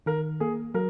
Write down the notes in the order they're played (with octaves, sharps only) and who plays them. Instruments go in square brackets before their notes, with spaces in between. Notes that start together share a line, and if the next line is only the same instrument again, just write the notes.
[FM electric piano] D#3 [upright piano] A#4
[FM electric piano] A#3 [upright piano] G#4
[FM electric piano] F#3 [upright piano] A#4